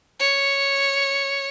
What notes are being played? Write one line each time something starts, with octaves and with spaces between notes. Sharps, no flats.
C#5